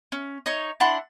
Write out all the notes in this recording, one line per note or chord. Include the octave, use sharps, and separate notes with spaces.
C#4
D#4 C#5
D4 E4 F#5 C6